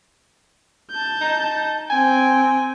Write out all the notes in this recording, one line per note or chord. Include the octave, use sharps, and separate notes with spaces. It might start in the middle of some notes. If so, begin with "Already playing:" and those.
A5 G6
D#4
C4 G5 G#5